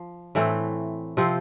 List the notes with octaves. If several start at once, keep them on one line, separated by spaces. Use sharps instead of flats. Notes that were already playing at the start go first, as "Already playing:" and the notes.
Already playing: F3
A2 E3 A3 C4
C3 F3 C4